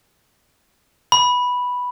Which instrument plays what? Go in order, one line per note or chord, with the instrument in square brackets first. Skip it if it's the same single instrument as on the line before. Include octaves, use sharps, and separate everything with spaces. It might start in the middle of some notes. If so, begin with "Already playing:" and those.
[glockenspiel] B5